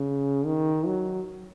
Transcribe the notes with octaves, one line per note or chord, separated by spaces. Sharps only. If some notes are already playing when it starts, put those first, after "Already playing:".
Already playing: C#3
D#3
F#3